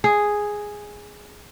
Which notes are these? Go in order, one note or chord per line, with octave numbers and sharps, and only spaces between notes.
G#4